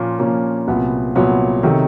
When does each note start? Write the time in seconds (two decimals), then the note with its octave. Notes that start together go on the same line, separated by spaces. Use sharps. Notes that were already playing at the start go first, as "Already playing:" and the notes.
Already playing: A#2 F3 A#3 C#4 F4
0.19 A#2 F3 A#3 C#4 F4
0.67 C2 A#2 F#3 B3
1.15 C2 A#2 F#3 B3
1.63 C3 D#3 F#3 A3